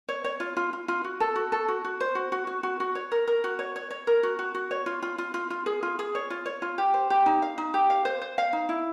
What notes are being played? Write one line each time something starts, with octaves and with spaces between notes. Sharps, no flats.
C#5
C#5
F4
F4
F4
F4
F#4
A4
F#4
A4
F#4
F#4
C5
F#4
F#4
F#4
F#4
F#4
C#5
A#4
A#4
F#4
C#5
C#5
C#5
A#4
F#4
F#4
F#4
C#5
F4
F4
F4
F4
F4
G#4
F4
G#4
C#5
F4
C#5
F4
G4
C5
G4
D#4
F5
D#4
G4
F5
C5
C5
F5
D#4
E4